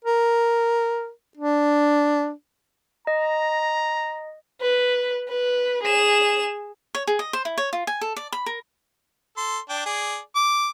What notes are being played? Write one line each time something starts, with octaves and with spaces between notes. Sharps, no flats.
A#4
D4
D#5 A#5
B4
B4
G#4 E7
C#5
G#4
D#5
C5
E4
C#5
F4
G#5
A4
D5
B5
A#4
A4 C6
D4 G5
G#4 D5
D6